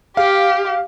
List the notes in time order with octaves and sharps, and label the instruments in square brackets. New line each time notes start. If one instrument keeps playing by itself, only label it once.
[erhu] G4 [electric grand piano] F5